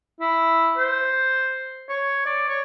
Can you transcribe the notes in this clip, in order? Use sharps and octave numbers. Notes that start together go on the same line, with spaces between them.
E4
C5
C#5
D5
C#5